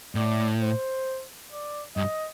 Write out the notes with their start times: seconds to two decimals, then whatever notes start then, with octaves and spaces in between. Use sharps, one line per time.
0.15 A2 D5
0.61 C5
1.51 D5
1.96 G2 D#5